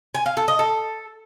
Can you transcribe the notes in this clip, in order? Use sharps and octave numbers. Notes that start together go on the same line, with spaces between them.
G#5
F5
A4
D#5
A4